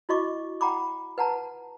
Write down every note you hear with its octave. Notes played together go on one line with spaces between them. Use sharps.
E4 F#4 D#5 C#6 D6
F#5 G5 A#5 B5 D6
B4 F#5 A5 A#5